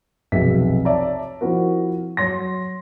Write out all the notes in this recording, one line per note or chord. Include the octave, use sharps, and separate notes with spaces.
F1 B1 G#4 E5 B6
C#5 D5 E5 A5 A#5
F3 C4 E4 F#4 A#4
F#3 C#5 C6 A#6